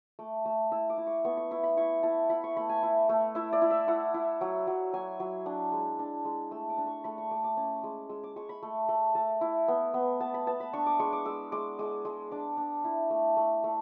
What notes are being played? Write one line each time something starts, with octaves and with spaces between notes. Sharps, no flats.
A3 D6
A3 E6
E4 E6
D6
E4
C#6
B3 C#6
C#6
E4 C#6
B5
E4 C#6
E4 A5
E4 B5
C#6
A3 B5
G#5
E4
A3
E4 E5
D5
E4
E5
E4 F#5
E4
F#3
F#3
F#3 G#5
F#3
D4 F#5
G#3
D4
G#3
A3 E6
D6
D4
C#6
A3 B5
C#6
A3 D6
D6
C#4
G#3
G#3 E6
D6
G#3 C#6
B5
A3
A3
A3 A5
E4
B3
B3
B3 A5
B5
B3 A5
B5
D4 C#6
D6
G#3 C#6
D6
G#3 E6
G#3 D6
G#3 D6
G#3
D4 D6
D4
E4
A3
A3
A3